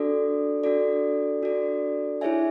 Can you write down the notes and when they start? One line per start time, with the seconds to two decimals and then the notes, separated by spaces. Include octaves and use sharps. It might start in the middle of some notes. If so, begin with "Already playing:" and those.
Already playing: D4 F#4 A4 D5
0.64 D4 F#4 A4 D5
1.42 D4 F#4 A4 D5
2.21 E4 G#4 C#5 E5 G#5